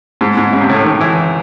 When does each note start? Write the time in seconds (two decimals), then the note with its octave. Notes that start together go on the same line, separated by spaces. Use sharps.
0.21 G#2
0.37 G#2
0.53 C#3
0.61 C3
0.69 A2
0.85 D#3
1.01 E3